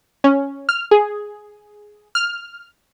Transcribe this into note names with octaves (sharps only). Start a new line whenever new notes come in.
C#4
F6
G#4
F6